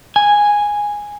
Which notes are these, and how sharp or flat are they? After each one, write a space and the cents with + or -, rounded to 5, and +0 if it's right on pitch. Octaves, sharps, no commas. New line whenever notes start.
G#5 -5